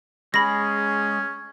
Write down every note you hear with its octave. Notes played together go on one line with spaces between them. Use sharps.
G#3 C#4 G#4 B5 A#6